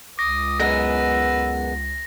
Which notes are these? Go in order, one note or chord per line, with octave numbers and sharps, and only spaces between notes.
C#2 D6 D#6 A#6
F#2 G#3 B3 B4 E6 A#6